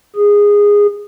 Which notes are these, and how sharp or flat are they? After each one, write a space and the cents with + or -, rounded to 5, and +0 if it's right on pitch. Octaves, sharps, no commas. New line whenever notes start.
G#4 -15